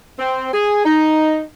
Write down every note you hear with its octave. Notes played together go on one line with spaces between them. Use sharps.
C4
G#4
D#4